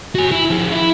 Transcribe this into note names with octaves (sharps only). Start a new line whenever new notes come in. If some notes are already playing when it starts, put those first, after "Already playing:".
F#4 G#5
E4
F3 G#4
E4